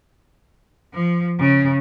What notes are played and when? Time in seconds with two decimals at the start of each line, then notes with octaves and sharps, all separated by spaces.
0.93 F3
1.39 C#3